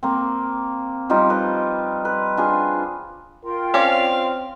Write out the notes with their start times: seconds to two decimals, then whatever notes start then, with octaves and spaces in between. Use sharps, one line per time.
0.03 A#3 C4
1.09 F3 G3 D#4 F4
1.30 B4 D#5
2.05 B4
2.37 D4 F4 G#4
3.44 F4 A#4 G5 C6
3.74 C4 C#4 D5 F5